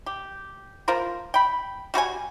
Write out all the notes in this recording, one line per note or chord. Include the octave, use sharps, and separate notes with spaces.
G4
F3 F4 A#4 C5
G5 B5
G3 F#4 B4 G#5